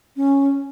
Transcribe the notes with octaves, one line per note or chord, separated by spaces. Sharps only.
C#4